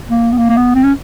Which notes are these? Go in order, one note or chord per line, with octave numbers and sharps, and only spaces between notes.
A#3
B3
A#3
A#3
B3
C4
C#4